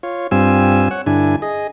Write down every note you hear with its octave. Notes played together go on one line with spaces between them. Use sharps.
F4 C#5
G2 G3 C4 F4 G#5 E6
C#5 F#5
G2 D3 D4 E4 G#5
G#4 D#5